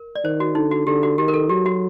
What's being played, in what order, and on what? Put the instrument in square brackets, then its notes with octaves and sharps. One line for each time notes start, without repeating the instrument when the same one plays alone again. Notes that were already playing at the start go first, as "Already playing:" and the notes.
Already playing: [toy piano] A#4
D5
[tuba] D#3 [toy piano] C5
[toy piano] F#4
[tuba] D3 [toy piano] D#4
[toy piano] F#4
[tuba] D3 [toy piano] G4
[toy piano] F#4
[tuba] D#3 [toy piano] G4
[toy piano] A#4
A4
[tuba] F#3 [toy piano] G4
[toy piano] F#4